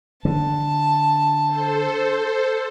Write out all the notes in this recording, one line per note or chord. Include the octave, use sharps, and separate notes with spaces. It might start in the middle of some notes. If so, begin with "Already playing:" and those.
D3 A5
A4 C5